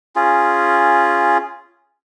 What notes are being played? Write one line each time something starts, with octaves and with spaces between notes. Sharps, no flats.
C#4 F4 G#4